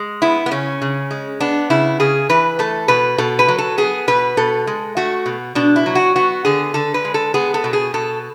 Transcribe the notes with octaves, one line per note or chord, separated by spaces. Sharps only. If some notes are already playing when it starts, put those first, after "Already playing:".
Already playing: G#3
B3 E4
B3
C#3 C#4
C#3
G#3
B3 D4
C#3 E4
C#3 G#4
E3 B4
A3 A4
B2 B4
B2 A4
B4
F#3
A4
B3 G#4
B2 B4
B2 A4
G#3
A3 F#4
B2
B2 D4
E4
F#3
F#4
B3 F#4
D3 G#4
D3 A4
B4
G#3
A4
B3 G#4
A4
B2
G#4
B2 A4